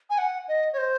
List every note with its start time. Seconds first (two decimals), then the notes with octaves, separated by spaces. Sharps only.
0.10 G#5
0.18 F#5
0.48 D#5
0.73 C#5
0.78 C5